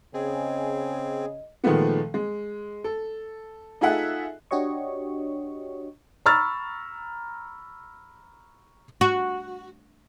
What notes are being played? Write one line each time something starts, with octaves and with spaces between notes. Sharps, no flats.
C#3 C4 G#4 D#5
A#2 D#3 F3 G#3 A3 B3
G#3
A4
D#4 F4 G#4 A4 E5 F#5
D4 F#4 G4 C#5 D#5 C#6
A#5 B5 C#6 E6 F6 A6
F#4